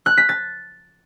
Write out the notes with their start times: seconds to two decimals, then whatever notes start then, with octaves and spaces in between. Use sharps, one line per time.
0.06 F#6
0.18 B6
0.29 A6